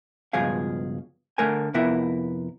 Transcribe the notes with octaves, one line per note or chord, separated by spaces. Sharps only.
C#2 G2 B2 F3 G#4 F5
D3 A3 A#4 G#5
F2 C3 B3 E4 A#4 E5